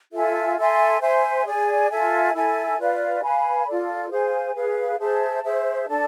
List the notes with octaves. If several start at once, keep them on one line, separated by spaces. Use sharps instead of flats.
F4 A4 E5 G#5
A4 E5 G#5 C6
C5 E5 G#5 C6
G#4 D5 G#5
F4 A4 E5 G#5
E4 A4 E5 G#5
F4 B4 D5 F5
B4 F5 G#5 B5
F4 A4 D5
G#4 C5 F5 G#5
G#4 B4 F5
G#4 C5 E5 A5
G#4 C5 E5
D4 A4 D5 A5